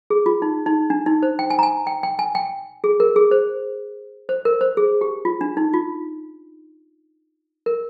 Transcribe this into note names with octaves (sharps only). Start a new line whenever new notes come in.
G#4
F4
D#4
D#4
D4
D#4
C5
G5
G#5
A#5
G#5
G5
G5
G#5
G5
G#4
A#4
G#4
C5
C5
A#4
C5
G#4
G4
F4
D4
D#4
F4
A#4